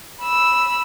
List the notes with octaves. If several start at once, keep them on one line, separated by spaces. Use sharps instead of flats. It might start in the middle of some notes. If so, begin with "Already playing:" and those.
B5 E6